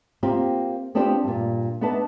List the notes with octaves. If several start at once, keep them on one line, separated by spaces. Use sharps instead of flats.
A#3 C4 F4 G4 A#4
B3 C4 D4 F4 G4 C5
G2 A#2
B3 D4 D#4 B4 E5 A5